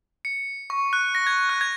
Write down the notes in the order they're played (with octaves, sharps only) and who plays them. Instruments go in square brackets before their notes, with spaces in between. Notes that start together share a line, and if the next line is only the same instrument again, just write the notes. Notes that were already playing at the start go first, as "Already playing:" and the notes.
[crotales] C#7
C#6
F#6
A#6
G#6
F#6
G#6